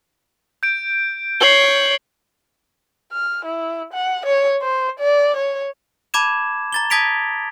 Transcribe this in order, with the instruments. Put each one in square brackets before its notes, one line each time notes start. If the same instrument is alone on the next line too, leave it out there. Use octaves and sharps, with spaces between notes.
[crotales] G6 D7
[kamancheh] C#5 [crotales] C7 F#7 G7
[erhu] F6
E4
F#5
C#5
C5
D5
C#5
[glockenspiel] A5 B5 D6 G#6 E7
A#5 A6 G7
A5 D#6 G#6 B6 D7 F7